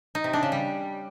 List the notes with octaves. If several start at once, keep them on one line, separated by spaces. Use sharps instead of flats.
D#4
C3
D4
C#3
G3